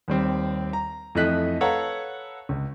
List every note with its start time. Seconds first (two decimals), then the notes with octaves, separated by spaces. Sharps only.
0.08 D#2 G3 C4
0.73 A#5
1.15 F2 E3 A3 D#5 F#6 B6
1.61 A4 B4 C#5 F5 F#5 A#5
2.49 C#2